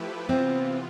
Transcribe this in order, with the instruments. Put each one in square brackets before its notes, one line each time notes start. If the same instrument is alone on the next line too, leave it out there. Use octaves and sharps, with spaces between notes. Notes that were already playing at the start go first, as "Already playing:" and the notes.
Already playing: [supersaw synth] F3 A3 E4 G4 B4
[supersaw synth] C3 E3 B3 F4 [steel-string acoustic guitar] C4